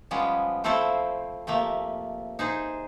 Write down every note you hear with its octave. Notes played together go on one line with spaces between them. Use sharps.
F3 G3 G#3 B3 C#4
F3 A3 C4 E4 A4 C5
C3 F3 A3 A#3
D#4 G#4 C5